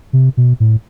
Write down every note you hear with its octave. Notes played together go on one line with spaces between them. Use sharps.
C3
B2
A2